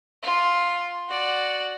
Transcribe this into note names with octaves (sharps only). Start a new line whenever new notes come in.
F4
F#4 D5